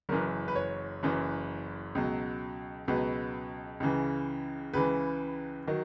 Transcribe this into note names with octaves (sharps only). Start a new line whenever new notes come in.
F#1 F#2 E3 A#4
B4
C#5
F#1 F#2 E3
C#2 B2 F#3
C#2 B2 F#3 B4
C#2 C#3 E3
C#2 C#3 E3 B4
D#3 F#3